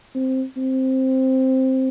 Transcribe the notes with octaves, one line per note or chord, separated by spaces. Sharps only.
C4
C4